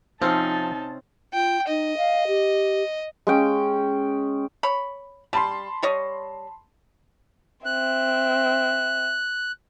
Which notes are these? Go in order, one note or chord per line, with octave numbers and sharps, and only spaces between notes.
C3 F3 C4 C#4 D#4 A5
F4 G5
D#4 D#5
F5
G4
G#3 C#4 G5
C#5 B5
G3 A5 B5 C6
G3 C#5 D#5
C4 E5 F#6